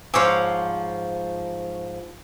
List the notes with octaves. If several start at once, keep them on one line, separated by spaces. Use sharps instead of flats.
G#2 F3 G#4 C5 C#5 F5 D6 E6